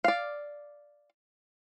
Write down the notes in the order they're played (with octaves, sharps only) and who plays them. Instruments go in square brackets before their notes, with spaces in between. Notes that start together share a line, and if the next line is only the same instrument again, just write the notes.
[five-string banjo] D5 F5